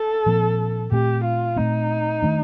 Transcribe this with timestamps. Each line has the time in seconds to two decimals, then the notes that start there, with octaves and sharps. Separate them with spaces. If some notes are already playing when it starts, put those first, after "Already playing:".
Already playing: A4
0.26 A#2 F3 C4
0.92 A#2 A3 C4 G4
1.25 F4
1.56 A#2 A3 C4 D#4
2.22 D#3 A3 D4